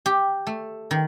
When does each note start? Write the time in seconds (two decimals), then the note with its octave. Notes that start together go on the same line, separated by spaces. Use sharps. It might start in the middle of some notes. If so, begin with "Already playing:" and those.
0.06 G4
0.47 A3
0.91 D#3